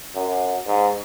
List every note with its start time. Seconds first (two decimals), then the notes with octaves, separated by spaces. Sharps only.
0.15 F#2
0.67 G#2